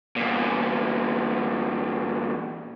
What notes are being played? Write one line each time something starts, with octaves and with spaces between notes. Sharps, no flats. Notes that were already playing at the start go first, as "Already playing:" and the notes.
E2 A#2